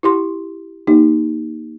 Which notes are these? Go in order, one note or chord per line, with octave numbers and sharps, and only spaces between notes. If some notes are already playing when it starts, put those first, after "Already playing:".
E4 G4 C6
A#3 D#4 G4